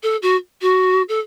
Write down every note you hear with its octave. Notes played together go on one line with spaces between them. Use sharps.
A4
F#4
F#4
A4